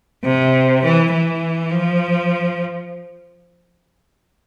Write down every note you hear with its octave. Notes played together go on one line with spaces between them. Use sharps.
C3
E3
E3
F3